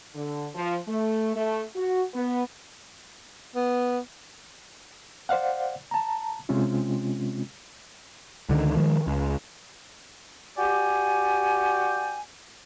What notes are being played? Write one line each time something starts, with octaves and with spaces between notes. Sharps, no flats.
D3
F3
A3
A3
F#4
B3
B3
C5 D5 F5 F#5
A5 A#5
C3 G#3 C4 C#4 F4
C#2 D3 D#3
D#3 F3 G#3
C#2
F#4 G4 D5 G5 G#5